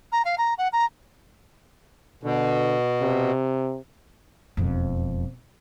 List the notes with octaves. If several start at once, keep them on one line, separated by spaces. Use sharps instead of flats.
A#5
F5
A#5
F#5
A#5
B2 D3
C3
E1 F2